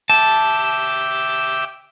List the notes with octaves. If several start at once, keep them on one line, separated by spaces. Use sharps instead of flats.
E5 G5 A5 D6